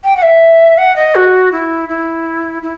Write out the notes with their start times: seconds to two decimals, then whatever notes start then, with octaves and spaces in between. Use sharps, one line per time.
0.04 G5
0.16 F#5
0.22 E5
0.77 F#5
0.96 D#5
1.15 F#4
1.52 E4
1.89 E4
2.62 E4